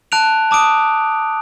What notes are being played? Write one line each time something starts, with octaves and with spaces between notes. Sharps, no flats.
A5 F#6 D7 F7
A5 D6 D#6 D7